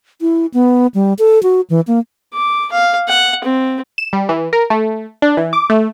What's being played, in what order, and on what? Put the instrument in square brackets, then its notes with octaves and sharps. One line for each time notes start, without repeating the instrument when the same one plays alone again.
[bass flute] E4
B3
G3
A4
F#4
E3
A#3
[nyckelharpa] D6
F5
F#5
C4
[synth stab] E7
G3
E3
A#4
A3
D4
E3
D6
A3